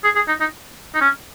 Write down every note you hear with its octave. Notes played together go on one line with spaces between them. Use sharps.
G#4
G#4
D#4
D#4
D#4
C#4